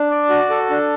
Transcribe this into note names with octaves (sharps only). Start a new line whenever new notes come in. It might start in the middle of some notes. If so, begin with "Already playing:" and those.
Already playing: D4
D5
F#4
A4
D4